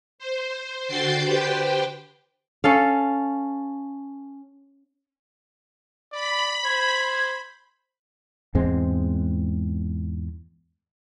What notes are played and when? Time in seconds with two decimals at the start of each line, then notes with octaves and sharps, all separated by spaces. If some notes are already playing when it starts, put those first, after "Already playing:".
0.19 C5
0.87 D3 F#4 G5 G6 A6 C7
1.24 G4 B4 C5 G5
2.64 C#4 A4 F5
6.12 D5 B5
6.64 C5 G#6
8.55 E2 G#2 G#3 C4